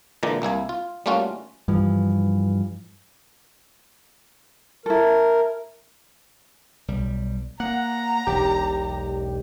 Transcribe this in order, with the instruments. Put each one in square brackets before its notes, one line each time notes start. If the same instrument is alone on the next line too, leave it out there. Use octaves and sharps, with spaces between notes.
[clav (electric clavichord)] A#2 D3 E3 G#3 D5 A#5
C2 A#3 E4 G#5
F4
G3 A3 A#3 C#4 F4 F#4
[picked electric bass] G2 E3 F3
[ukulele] E4 A4 [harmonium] A#4
[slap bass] B1 G3
[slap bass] A#3 [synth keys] F#5 [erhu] A#5
[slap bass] E1 B1 [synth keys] G4